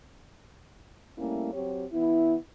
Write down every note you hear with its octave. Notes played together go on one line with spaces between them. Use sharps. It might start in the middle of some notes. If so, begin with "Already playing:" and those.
G3 A3 A#3 C#4 E4
F#3 C4 G4 C#5
E3 B3 E4